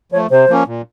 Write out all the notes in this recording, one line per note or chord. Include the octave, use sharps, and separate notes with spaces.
F3 A3 C#5
C3 C5
F3 A#3 C#4
A#2